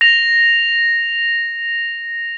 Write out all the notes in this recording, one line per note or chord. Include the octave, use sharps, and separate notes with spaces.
A#6 F7